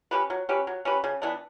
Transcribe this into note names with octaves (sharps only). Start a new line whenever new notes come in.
C#4 G4 B4
F#3
C#4 G4 B4
F#3
C#4 G4 B4
C#3
E3 B3 D4